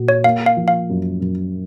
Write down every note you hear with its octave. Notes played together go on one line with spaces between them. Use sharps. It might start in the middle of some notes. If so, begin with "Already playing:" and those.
Already playing: A#2 F#4
C#5
A#3 F5
F5
F3
F5
F#2
F#2